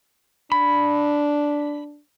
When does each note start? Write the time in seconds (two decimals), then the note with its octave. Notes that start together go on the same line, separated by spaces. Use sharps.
0.52 D4 B5